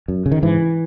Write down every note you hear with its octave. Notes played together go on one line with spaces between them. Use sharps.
F#2
C#3
D#3
G#2 E3